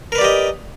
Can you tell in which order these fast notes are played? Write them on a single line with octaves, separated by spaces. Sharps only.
A#4 B4 D5 G4 D#5